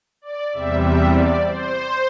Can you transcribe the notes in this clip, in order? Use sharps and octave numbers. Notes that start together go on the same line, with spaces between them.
D5
E2 C3 G3 E5
E5
D5
C5